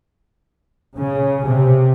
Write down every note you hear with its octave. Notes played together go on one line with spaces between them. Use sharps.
C#3
C3